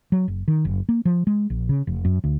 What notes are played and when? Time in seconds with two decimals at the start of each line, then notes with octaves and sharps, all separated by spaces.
0.12 F#3
0.28 F#1
0.48 D#3
0.65 F#1
0.89 A#3
1.05 F3
1.27 G#3
1.50 A#1
1.69 C#3
1.87 F1
2.05 F#2
2.24 D2